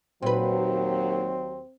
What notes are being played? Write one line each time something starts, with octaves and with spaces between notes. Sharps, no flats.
D#2 A#2 F#3 C4 B4